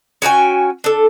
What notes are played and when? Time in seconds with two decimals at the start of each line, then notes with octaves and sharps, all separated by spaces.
0.22 C#4 F#4 G5 G#5
0.84 D4 A4